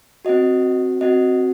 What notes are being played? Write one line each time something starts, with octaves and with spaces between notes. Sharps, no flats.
C4 F#4 D#5
C4 F#4 D#5